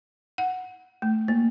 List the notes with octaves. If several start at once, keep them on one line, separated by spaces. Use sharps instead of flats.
F#5
A3
A#3